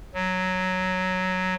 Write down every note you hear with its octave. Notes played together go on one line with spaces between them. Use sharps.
F#3